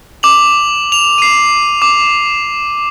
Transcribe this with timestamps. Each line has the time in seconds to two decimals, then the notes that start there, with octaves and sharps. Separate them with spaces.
0.23 D6 F7 F#7
0.92 F7
1.18 C7 D#7
1.82 D6